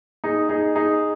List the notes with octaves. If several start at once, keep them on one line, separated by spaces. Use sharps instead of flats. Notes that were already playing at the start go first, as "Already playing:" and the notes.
D#4 G#4
D#4 G#4
D#4 G#4